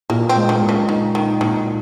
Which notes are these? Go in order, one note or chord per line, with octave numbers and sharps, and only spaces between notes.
A#2 A#3
C4
G#3
D#3
A#2
C#3
D#3 D#4
D#3 D#4
A#2 D#3